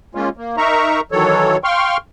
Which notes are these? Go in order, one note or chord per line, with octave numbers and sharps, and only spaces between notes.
G#3 A#3 C#4 F4
A#3
D#4 A#4 E5 A#5 C#6
D#3 E3 F#3 A4 C#5
F5 G5 C6 C#6 F6